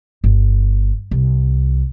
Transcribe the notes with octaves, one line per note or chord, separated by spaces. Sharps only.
G1
C2